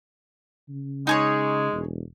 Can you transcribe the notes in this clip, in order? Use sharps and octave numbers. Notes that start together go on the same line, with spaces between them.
C#3
G#3 D#4 G#4 C#5
E1